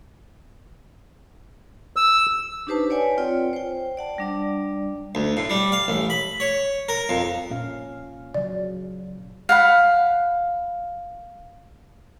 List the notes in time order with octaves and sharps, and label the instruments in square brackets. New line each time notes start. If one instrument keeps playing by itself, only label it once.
[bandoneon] E6
[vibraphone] D4 D#4 G4 B4 C5 A5
B4 C#5 D5 F#5 G#5
C4 F4 C#5 D5 G5
C5 G5
D5 F#5 A5
G3 D4 D5
[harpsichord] D2
A2
G3
F5
A1
B5
C#5
A#4
F2
[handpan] A#2 C#4 F5
[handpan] C#3 F#3 [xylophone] D5
[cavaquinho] F5 F#5 B5